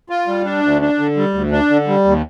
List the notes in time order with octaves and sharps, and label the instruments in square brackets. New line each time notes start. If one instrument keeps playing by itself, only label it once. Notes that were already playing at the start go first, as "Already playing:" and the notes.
[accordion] F4
G3
D4
D2
D4
D3
G3
D2
D4
D3
G3
D#2